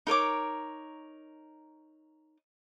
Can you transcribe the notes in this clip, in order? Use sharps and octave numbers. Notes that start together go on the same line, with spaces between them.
D#4 A#4 C#5 D6